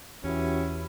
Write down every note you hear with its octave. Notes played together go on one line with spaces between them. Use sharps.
E2 E3 C#4 E4 F#4 G4